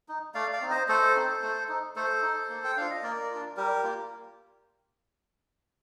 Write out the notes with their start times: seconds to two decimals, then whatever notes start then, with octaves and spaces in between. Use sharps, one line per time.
0.09 D#4
0.35 A3 D5 F5
0.53 D5 F5
0.62 C4 D#4
0.70 C5 D#5
0.88 A3 A4 C5
1.15 C4 D#4
1.42 A3
1.69 D#4
1.96 A3 A4 C5
2.22 D#4
2.49 A#3
2.64 G5
2.77 D4 F4 F5
2.91 D#5
3.03 A#3 A#4 D5
3.31 D4 F4
3.56 G3 G4 A#4
3.84 A#3 F4